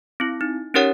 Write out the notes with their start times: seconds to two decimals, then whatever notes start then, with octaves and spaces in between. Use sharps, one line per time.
0.20 C4 E4
0.41 D#4
0.74 C#4 D#4 G4 A#4 C#5 F#5